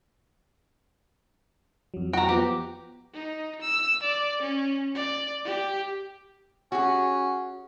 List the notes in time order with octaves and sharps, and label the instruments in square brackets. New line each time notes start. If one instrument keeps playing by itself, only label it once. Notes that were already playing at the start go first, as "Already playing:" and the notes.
[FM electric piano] F2 F#3
[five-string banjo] F#4 [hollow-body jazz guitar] G5 A#5
[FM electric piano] F3 B3 [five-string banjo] G4
[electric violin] D#4
E6
D5
C#4
D5
G4
[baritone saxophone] C#4 [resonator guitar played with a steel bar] F#4 G#4